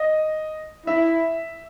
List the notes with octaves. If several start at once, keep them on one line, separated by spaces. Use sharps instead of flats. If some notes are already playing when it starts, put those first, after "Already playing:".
Already playing: D#5
E4 E5